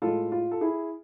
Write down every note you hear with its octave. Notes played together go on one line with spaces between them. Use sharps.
A2 G#3 F4 A4
F4
A4
E4 G#4